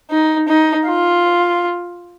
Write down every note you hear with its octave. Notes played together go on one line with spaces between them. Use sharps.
D#4
D#4
F4